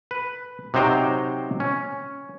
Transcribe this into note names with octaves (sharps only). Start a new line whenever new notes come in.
B4
C3 F#3 D#4 C5 G5 A#5
C#4